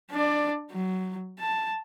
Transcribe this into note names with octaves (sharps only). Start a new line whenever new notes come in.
D4 D5
F#3
A5